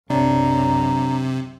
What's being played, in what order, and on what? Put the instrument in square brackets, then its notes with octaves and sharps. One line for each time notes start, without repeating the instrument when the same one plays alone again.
[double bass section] B1 F#2 [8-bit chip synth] C3 [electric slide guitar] D4 C#5 [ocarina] A#5